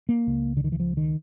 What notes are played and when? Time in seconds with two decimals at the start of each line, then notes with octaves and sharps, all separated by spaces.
0.09 A#3
0.26 C#2 C#3
0.57 D3
0.64 D#3
0.72 E3
0.80 F3
0.97 D#3